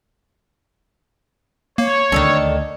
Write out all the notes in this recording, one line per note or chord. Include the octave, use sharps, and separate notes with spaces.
A#3 C#5
D2 D3 D#3 D4 A4